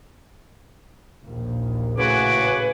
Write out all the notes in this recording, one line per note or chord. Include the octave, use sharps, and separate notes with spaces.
A#1 D#2
A2 C#3 F#4 B4 G#5 D6